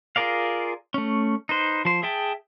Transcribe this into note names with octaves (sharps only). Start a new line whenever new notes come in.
F4 G#4 A#4 D5 F5
A3 C#4
D#4 B4 C5
F3 C5
G#4 E5 G5 A5